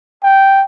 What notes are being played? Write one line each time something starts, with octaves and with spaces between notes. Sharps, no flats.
G5